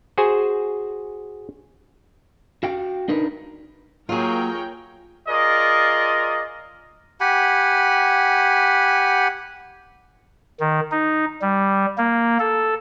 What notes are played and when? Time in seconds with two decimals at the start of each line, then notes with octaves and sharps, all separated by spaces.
0.18 F#4 G#4 C5 G#5
2.63 F#4 F5 G5
3.08 D4 D#4 A#4 B4
4.09 F#3 A#3 F4 G#4 A#4 C#5 G5
5.28 F4 G#4 A#4 D5 D#5
7.21 G4 F#5 G#5 B5
10.60 D#3
10.92 D#4
11.42 G3
11.98 A#3
12.39 A4